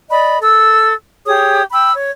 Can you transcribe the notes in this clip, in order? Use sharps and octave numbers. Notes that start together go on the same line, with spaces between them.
D5 D#5 B5
A4 E6
G4 G#4 C#5 D#6
G5 B5 E6
C#5